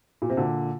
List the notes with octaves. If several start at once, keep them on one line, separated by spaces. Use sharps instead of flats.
A#2
C3
A#2 D3